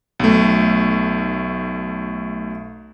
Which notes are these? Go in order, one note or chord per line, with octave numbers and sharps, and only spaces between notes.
B1 A3